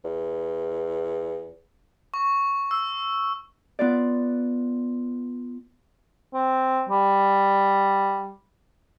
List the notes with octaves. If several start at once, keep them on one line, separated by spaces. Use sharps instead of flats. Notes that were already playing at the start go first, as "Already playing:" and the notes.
E2
C#6
E6
B3 F4 D5
C4
G3